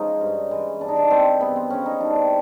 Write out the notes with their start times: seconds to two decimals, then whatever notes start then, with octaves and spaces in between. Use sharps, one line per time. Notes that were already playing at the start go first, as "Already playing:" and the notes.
Already playing: G#2 F3 G#3 C#4 D#4
0.21 G2
0.51 E3 G#3
0.81 G2 D4
0.88 D#4
0.96 D4
1.11 E3 G#3 C4
1.40 G2 B3
1.56 C4
1.70 D3 F3 G#3 C#4
1.86 D#4
2.00 G2 D4
2.15 C4